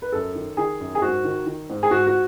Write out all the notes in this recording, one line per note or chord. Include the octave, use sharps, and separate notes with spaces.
B4
F#2 A4
D#3
D#3 G#4
F#2
G#4
G#2 F#4
D#3
D#3
G#2
G#4
G#2 F#4
F#4